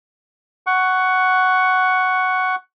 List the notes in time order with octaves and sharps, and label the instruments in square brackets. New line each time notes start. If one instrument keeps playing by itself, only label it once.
[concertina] F#5 C#6